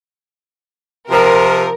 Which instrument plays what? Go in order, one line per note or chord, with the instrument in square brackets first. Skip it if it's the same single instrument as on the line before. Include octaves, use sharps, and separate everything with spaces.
[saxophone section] C3 F3 [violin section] A#4